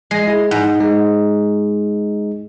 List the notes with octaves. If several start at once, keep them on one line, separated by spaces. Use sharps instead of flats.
G#3 A#6 C7
E4 G#4
G#2 F#5
G#3 D#4